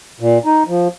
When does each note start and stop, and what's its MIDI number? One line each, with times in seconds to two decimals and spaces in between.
0.20 0.38 46
0.45 0.63 63
0.68 0.88 53